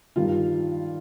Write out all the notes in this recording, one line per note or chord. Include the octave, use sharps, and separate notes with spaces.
G2 D#3 G3 F4